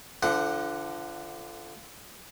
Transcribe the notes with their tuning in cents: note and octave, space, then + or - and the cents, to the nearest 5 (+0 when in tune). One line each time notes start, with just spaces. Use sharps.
D3 +0 F3 -35 F#5 +0